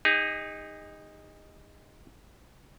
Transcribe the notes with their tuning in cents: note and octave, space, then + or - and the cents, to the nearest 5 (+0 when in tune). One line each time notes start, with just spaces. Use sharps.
D#4 +0 G#4 -45